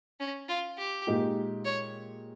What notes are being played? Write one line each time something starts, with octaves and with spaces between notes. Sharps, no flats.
C#4
F4
G4
A#2 G#3 D#4 G4
C#5